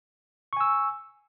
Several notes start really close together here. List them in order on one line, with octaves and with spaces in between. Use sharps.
C#6 G#5 E6